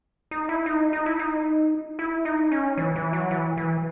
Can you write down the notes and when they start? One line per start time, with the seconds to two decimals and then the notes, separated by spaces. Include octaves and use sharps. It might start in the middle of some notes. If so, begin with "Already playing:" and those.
0.31 D#4
0.49 E4
0.66 D#4
0.93 D#4
1.06 E4
1.19 D#4
1.99 E4
2.25 D#4
2.52 C#4
2.77 E3
2.96 E3
3.13 F#3
3.31 E3
3.57 E3